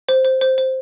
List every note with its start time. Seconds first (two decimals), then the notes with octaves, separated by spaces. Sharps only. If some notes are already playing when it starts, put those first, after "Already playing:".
0.09 C5
0.25 C5
0.41 C5
0.58 C5